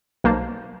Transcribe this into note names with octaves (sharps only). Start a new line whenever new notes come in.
B1 A#3 C5 A5